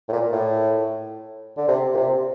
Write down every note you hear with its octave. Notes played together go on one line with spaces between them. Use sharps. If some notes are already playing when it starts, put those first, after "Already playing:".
A2
A#2
A2
D3
C3
A#2
C3